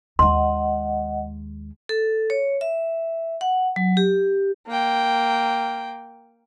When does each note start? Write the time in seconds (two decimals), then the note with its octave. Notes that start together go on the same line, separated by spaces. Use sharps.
0.19 D#2 G#3 D#5 F#5 C6
1.89 A4
2.30 C#5
2.61 E5
3.41 F#5
3.76 F#3
3.97 G4
4.67 A#3 G5